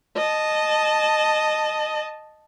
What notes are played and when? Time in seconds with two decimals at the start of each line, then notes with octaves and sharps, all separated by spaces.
0.17 D#5 A5